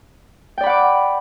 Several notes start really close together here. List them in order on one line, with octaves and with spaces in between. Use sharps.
G5 D5 B5 F#5 D6